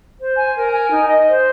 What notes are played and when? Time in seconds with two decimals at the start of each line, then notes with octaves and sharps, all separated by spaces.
0.19 C5
0.37 G#5
0.55 A#4
0.73 G#5
0.90 D#4
1.08 D#5
1.27 C5